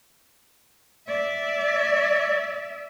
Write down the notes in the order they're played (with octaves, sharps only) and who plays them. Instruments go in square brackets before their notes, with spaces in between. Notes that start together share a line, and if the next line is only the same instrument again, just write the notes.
[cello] D5 E5